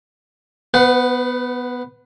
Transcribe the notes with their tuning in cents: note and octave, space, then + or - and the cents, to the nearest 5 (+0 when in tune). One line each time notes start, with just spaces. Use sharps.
B3 +0 B4 +45 F#5 +0